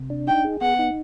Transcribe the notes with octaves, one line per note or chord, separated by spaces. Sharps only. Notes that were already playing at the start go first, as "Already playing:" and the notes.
Already playing: C3
D4
D#4 G5
G#4
B3 F#5
D#4